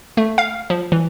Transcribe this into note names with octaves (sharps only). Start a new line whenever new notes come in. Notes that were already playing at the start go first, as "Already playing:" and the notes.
A3
F5
F3
E3